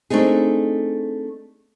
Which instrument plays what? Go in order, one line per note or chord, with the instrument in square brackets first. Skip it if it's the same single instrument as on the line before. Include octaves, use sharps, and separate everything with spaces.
[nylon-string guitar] A3 C4 D4 D#4 G#4